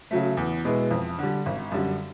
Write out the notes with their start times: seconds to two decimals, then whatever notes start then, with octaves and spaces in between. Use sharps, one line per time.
0.11 C#3 F#3 A3
0.37 E2
0.65 B2 G#3 B3 E4
0.91 F2
1.18 D3 G3
1.46 G#1
1.72 F#2 D3 G3